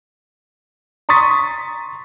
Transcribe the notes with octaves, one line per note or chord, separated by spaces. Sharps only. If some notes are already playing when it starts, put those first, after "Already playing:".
A#5 C6 C#6 D#6 A6 B6